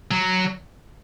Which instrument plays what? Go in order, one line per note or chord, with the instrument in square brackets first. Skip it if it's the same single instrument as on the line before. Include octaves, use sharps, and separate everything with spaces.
[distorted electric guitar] F#3